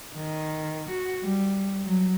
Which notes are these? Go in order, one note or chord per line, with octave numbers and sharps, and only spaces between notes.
D#3
F#4
G3
F#3